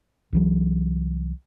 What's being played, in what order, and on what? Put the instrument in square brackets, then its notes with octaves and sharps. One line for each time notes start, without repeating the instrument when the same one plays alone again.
[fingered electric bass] C2 E3 F#3